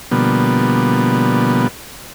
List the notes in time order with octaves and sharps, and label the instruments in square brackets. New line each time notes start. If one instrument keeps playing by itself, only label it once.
[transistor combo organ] B2 D3 F3 G3 A#3 B3